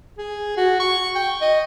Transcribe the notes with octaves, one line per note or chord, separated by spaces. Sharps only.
G#4
F#4
C#6
G5
D#5